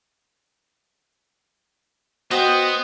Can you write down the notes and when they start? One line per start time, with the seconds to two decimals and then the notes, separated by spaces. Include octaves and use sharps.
2.31 B3 F#4 C5 D#5 G5